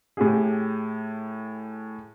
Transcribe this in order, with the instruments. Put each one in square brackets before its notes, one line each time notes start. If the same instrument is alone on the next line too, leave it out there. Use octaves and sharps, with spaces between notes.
[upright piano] A2 G4 G#4